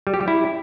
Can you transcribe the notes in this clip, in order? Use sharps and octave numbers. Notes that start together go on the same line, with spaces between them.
G3
G4
G3
E4